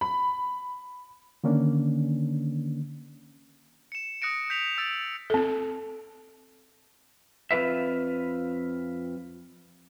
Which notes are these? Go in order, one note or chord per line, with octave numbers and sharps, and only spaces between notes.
B5
D3 D#3 A#3 C#4 D4
C#7 E7
D#6 F#6 A#6 C#7 D7
G6 B6 D7 F7
E6 A6 D7
C4 A4
F2 D#3 F4 B4 E5